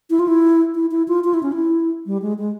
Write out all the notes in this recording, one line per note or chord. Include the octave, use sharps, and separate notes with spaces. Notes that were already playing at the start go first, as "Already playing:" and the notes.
E4
F4
E4
E4
E4
F4
F4
E4
C#4
E4
G3
G#3
G#3